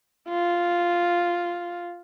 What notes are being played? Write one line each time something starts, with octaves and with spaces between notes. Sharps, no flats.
F4